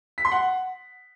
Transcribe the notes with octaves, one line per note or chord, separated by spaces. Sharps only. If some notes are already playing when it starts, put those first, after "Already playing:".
B6
C6
F#5